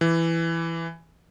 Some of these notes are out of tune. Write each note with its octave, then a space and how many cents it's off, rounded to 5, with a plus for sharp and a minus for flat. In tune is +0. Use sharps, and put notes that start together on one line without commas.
E3 +10